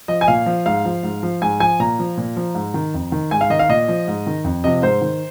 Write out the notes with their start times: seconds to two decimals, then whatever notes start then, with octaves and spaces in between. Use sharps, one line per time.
0.08 F3 D#5
0.21 G#5
0.28 A#2 F5
0.46 F3
0.66 G#2 F5
0.85 F3
1.03 G#2
1.23 F3
1.42 G#2 G#5
1.60 F3 G#5
1.80 A#2 A#5
1.99 F3
2.17 A#2
2.36 F3
2.55 G#2
2.74 D#3
2.94 F2
3.12 D#3
3.31 G#2 G#5
3.41 F5
3.50 D#3 D#5
3.59 F5
3.69 A#2 D#5
3.88 F3
4.08 G#2
4.27 D#3
4.44 F2
4.64 C3 F3 D#5
4.82 G#2 C5
5.01 D#3